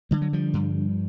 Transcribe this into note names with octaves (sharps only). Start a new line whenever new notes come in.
D3 G3
F#3
F3 G3
G2